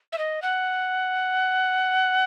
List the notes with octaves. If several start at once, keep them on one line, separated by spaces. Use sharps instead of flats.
E5
D#5
F#5